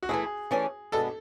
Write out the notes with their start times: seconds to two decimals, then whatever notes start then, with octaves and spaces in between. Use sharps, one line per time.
0.03 F#4
0.09 E3 A3 E4 G#4
0.51 E3 A3 C#4 G#4 D5
0.92 B2 G#3 B3 D4 A4